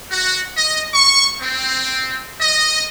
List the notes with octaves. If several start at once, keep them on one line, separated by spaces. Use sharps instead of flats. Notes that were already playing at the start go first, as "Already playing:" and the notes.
F#4
D#5
C#6
C4
D#5